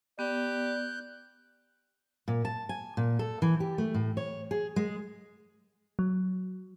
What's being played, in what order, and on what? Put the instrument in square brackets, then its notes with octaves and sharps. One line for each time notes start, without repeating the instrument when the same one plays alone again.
[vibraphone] B3 [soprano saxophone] G4 [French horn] D5 [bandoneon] F#6 G6
[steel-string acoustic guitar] A#2
A5
G#5
A#2
A4
E3
G4
A3
A2
C#5
G#4
G#3
[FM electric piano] F#3